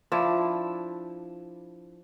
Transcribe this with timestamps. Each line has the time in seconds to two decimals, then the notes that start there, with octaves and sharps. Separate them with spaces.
0.12 F3 D4 E4